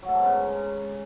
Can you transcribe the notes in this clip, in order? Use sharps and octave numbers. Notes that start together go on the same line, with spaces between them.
F#3
A3
G#2
B2
C#3